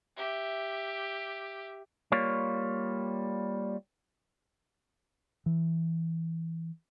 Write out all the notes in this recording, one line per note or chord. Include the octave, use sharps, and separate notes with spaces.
G4 E5
G3 A#3 F4 C#5
E3